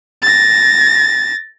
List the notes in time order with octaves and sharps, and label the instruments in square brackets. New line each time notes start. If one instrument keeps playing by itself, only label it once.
[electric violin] A6 A#6